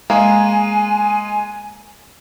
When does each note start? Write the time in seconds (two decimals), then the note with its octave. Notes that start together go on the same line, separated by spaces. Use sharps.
0.10 G#3 A#3 G#4 G#5